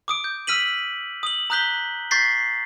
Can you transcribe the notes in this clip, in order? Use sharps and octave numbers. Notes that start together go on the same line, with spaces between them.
D6 D#6 D7
G6
E6 F6 B6 D#7 F#7
D#6 F#7
A#5 D#6 F#6 G6 B6 G7
C#6 G6 A6 B6 C7